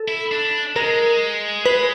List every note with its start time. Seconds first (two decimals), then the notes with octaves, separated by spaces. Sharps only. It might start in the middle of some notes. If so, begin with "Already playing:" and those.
Already playing: A4
0.08 E4
0.32 D4
0.76 G#3 A#4
1.66 B4